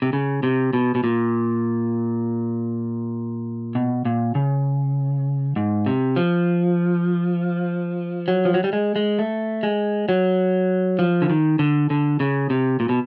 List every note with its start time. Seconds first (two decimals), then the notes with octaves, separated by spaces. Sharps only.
0.02 C3
0.13 C#3
0.43 C3
0.73 B2
0.95 B2
1.04 A#2
3.75 B2
4.05 A#2
4.35 C#3
5.56 G#2
5.86 C3
6.16 F3
8.28 F#3
8.45 F3
8.54 F#3
8.64 G3
8.73 G#3
8.96 G#3
9.19 A3
9.63 G#3
10.09 F#3
10.99 F3
11.22 D3
11.30 D#3
11.59 D3
11.90 D3
12.20 C#3
12.50 C3
12.80 A#2
12.89 B2